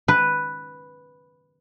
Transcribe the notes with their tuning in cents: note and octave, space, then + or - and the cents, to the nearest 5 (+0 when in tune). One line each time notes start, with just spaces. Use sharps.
B4 +0